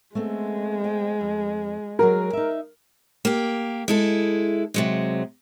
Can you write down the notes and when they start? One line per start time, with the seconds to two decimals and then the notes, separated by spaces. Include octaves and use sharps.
0.15 G#3 A3 B3 C4
0.84 C5 G5
1.21 F2
1.99 F#3 F#4 G#4 A#4
2.33 D#4 E5
3.25 A#3 G4
3.88 G#3 E4 A4
4.74 C3 F#3 G#3